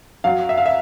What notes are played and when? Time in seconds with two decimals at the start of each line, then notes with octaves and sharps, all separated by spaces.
0.24 F#3 F5
0.49 E5
0.58 F5
0.66 E5